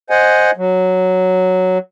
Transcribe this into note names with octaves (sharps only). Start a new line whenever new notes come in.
C5 D#5 F#5 G#5
F#3